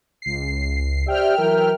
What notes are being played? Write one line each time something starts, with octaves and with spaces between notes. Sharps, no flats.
C#2 C7
G4 C5 D5 E5 G5 F6
E3 F#3 A#4